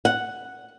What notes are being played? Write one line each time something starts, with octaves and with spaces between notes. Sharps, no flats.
F#5